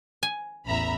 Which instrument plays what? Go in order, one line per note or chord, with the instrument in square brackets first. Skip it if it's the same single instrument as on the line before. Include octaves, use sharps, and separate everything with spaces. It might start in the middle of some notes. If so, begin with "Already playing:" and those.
[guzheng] G#5
[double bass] A1 E2 [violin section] E5 A#5 B5